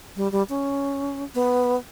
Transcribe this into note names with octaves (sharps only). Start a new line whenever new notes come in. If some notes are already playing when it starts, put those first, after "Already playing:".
G3
G3
C#4
B3